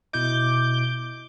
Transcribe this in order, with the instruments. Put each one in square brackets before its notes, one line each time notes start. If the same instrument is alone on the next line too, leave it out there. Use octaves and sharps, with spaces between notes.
[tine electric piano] B2 E4 D#5 [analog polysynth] D6 G6